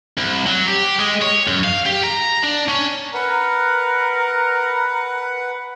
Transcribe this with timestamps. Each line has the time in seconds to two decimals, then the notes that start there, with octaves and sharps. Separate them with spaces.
0.18 C2
0.46 F#3
0.67 G4
1.00 G#3
1.22 C#5
1.48 F#2
1.64 F5
1.86 G4
2.03 A#5
2.43 D4
2.68 C#4
3.14 A#4 B4 F#5